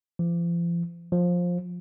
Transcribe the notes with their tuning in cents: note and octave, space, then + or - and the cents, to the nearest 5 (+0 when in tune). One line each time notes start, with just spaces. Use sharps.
F3 -40
F3 +15